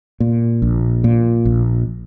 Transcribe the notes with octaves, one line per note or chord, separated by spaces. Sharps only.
A#2
A#1
A#2
A#1